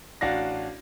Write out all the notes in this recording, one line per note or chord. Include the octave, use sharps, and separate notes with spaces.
A1 D4 F#4 D5 F5 A#6